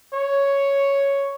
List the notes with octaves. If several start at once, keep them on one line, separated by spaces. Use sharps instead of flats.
C#5